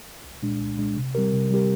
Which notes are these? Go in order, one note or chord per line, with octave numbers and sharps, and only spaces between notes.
C2
A#2 G#3 D4
C2
A#2 G#3 D4
C3
G3 C4 G4 A#4
C3
G3 C4 G4 A#4